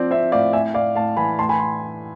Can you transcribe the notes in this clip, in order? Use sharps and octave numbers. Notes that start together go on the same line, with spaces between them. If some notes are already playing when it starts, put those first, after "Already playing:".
Already playing: F3 C4 D5
C4 C5 E5
A2 D5 F5
A2 E5 G#5
A2 D5 F5
A2 F5 A5
E3 G#5 B5
A2 A5 C6
G#5 B5
C6